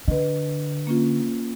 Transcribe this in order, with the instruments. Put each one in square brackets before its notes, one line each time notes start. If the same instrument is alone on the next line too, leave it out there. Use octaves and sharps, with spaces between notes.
[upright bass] D3 [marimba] B4 D#5
[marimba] A#3 C#4 F4